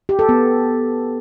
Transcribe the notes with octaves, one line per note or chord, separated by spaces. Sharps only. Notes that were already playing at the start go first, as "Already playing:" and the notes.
G4
A4
B3